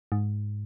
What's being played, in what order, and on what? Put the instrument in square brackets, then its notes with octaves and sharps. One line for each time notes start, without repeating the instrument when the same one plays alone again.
[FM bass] G#2